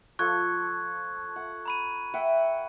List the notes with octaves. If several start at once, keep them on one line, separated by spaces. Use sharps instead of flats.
F3 A4 C#6 F#6 G#6
F#5
A#5 B5 D#7
E5 F#5 G5